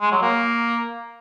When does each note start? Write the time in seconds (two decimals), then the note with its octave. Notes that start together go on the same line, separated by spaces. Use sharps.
0.01 G#3
0.11 F#3
0.22 A#3